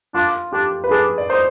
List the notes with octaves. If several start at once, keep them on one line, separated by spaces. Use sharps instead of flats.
D4 F4
D4 G4
B4
D4 G#4
D5
D#4 C5